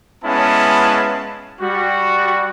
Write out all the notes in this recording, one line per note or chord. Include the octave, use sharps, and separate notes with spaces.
G#3 B3 C#4 E4 F5 A5
G3 F#4